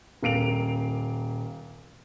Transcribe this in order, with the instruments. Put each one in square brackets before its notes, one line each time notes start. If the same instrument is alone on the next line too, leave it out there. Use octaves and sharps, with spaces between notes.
[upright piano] D#1 A#3 C7 D7 F7